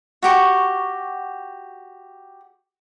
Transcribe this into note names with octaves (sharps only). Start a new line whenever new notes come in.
F#4 G4 C#6